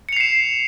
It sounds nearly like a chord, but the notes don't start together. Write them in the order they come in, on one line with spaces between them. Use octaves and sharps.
C#7 F7 C7 E7